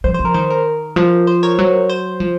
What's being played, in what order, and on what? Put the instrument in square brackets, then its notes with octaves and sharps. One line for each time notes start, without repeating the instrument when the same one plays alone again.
[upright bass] F3 [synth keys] C5
[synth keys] C5
[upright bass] F3
[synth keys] A#4
[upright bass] D#3 [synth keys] C5
[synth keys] A#4
[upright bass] F3
[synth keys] C5
A#4 C#5
[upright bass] F#3
[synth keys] C5
[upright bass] F3